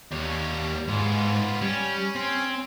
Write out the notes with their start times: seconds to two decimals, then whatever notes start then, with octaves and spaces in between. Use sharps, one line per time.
0.12 D#2 G3 C#5
0.89 G#2 B3 F4
1.62 G3 C#4
2.15 C4